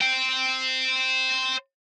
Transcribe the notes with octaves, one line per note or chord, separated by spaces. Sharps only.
C5 G5